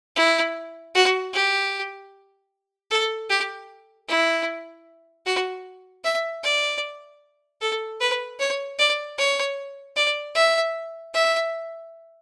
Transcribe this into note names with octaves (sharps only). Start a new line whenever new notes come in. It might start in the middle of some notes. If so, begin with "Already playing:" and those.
E4
F#4
G4
A4
G4
E4
F#4
E5
D5
A4
B4
C#5
D5
C#5
D5
E5
E5